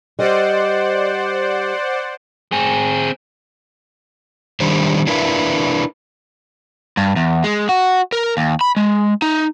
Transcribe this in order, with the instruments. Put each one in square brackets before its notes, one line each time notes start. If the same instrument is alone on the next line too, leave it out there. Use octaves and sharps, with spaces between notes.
[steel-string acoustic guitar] G3 D#5 [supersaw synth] C5 D5 F#5
[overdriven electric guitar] C4 G#4
[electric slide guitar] D#3 G3 D4 C5
D4 E4 A#4 B4 E5 F5
[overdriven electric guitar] G2
E2
G#3
F#4
A#4
D#2
B5
G#3
D#4